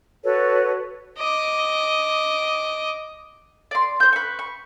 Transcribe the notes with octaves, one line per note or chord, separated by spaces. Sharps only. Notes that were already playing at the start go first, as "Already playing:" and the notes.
F#4 A4 B4 C#5
D#5 D6
D5 C6
C5 G6
B4 C#6
C#6